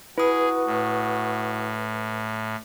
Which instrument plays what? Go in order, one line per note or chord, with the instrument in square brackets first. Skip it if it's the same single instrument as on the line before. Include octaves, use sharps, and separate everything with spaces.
[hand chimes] E4 D#6 [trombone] F#4 [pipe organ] G#4 [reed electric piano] B4
[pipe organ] A2